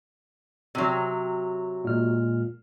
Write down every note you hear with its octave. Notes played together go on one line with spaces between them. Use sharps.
C3 F#3
A#2 G#3 F6